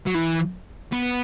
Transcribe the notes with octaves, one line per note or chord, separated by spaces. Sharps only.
F#3
E3
B3